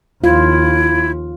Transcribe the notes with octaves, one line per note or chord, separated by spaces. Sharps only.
D#2 E4 F4